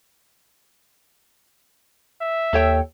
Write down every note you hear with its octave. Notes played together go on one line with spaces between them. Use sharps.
E5
D#2 A4 C#5 G5